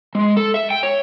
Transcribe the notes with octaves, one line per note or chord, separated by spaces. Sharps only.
G#3
A4
E5
G5
C#5